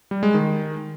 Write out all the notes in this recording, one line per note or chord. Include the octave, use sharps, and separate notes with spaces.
G3
G#3
D#3